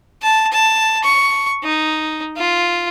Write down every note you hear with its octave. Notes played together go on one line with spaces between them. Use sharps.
A5
A5
C#6
D#4
F4